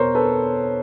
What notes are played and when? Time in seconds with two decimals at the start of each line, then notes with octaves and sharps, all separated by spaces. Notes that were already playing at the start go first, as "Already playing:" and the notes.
Already playing: E2 B2 A#4 C5 C#5
0.15 A4 B4